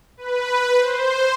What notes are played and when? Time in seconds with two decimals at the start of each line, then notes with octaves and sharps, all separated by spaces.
0.17 B4
0.78 C5